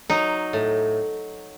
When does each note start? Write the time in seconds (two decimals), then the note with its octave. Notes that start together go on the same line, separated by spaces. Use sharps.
0.10 F#3 D#4
0.53 A2